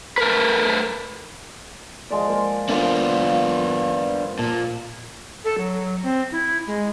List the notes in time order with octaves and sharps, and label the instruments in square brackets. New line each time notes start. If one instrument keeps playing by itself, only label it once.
[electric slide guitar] A3 A#4 B4
[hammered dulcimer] F3 G#3 D5
A#3 C5
[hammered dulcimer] A#3 F4 C5 [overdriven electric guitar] B3 D4
[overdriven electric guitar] A#2 [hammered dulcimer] A5
[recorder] A4
F#3
C4
E4
G#3